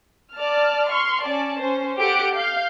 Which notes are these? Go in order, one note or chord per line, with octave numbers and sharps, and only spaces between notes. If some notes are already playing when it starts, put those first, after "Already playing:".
D5 A5 F6
C6 C#6 F6
C#4 D5 A5
C#4 C5
G4 A4 F#5 D7
F5 G6